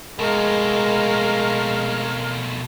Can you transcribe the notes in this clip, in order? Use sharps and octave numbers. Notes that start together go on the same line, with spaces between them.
B2 G#3 A3 A#4 F5